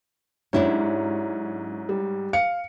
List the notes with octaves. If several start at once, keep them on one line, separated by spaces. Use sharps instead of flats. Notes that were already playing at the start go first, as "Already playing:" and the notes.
G#2 F#3 C#4 D4 E4 G4
G3
F5 C#7